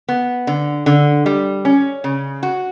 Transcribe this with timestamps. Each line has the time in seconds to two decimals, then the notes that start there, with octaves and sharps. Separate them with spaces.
0.09 B3
0.47 D3
0.86 D3
1.26 G3
1.65 C#4
2.04 C#3
2.43 F#4